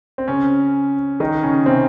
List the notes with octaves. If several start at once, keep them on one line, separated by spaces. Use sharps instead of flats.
C4
C#3 C#4
D#3 D#4
C#3 C#4
C3 C4